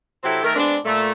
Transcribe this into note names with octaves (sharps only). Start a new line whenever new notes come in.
C3 F#3 C4 E4 G4 A4
D#3 A3 A#4
G#3 B3 C4 D4
A#2 A3